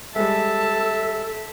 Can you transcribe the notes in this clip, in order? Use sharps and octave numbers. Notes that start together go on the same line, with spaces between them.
G3 G#3 A4 E5 A5